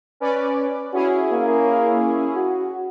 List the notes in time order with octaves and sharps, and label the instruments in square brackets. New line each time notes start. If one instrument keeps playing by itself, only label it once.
[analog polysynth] C#4 B4 D5
[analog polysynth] C#4 E4 G#4 [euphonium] F#4
[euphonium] A#3
F#4